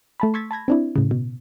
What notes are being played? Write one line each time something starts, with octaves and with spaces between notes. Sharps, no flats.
A3 A5 B5
C6 C#6 E6 G#6 A6 B6
A5 B5 G#6 A#6
C4 D4 E4
A2 C#3
B2